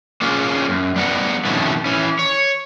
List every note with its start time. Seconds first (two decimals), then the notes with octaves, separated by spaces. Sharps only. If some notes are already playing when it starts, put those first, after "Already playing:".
0.21 A#3 C#4 F4 G#4
0.69 F#2
0.96 G3 B3 A#4 F#5
1.45 F2 B2 D#3 A3 C#4
1.85 E3 C#4
2.19 C#5